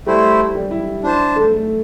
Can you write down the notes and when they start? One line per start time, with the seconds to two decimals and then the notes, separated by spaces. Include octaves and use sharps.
0.06 G3 A3 E4 G4 C5
0.55 G3 G4
0.71 E4
1.04 D4 E4 C5 A5
1.36 A3 A4
1.52 A3 A4